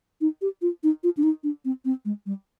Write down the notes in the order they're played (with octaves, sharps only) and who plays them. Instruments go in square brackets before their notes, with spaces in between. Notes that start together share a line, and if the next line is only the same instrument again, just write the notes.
[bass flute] D#4
G4
F4
D#4
F4
D4
D#4
D4
C4
C4
G#3
G3